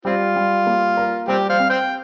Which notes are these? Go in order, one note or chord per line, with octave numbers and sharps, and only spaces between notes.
G3 C4 F4
G3
A#3
A#4
G3 C4 G4
C5 F5
C4
C5 G5